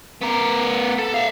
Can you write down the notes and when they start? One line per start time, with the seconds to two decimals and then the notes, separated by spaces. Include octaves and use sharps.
0.21 B3 A#4
0.98 A4
1.14 E5 F5